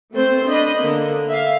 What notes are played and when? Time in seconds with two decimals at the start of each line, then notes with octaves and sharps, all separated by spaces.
0.14 A3 C4 C5
0.47 D4 D#5 B5
0.79 D3 A#3
1.29 E5 F5